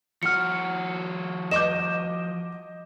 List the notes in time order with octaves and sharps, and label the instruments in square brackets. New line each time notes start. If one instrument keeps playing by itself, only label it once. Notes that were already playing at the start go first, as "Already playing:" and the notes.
[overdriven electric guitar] F3 F#4 [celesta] F6 C#7
[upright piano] D#5 D6 G6 [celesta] E7